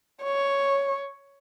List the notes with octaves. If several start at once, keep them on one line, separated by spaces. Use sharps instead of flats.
C#5